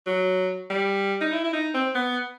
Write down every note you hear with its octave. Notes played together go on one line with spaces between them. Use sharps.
F#3
G3
D#4
E4
E4
D#4
C4
B3